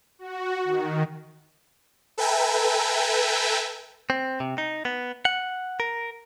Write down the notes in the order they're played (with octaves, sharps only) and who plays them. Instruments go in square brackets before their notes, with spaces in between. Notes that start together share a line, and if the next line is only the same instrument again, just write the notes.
[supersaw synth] F#4
D#3
A4 B4 E5 G5 G#5 A#5
[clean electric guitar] C4
C3
D#4
B3
F#5
A#4